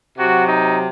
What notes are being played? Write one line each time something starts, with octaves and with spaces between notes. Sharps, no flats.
C3 F#3 F#4
D#4